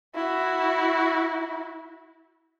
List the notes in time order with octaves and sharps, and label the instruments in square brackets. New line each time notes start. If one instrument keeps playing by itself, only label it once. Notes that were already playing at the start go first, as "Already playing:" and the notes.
[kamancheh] E4 F#4